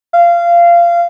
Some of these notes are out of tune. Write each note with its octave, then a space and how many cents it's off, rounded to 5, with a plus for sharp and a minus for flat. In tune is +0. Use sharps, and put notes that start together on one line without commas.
F5 -20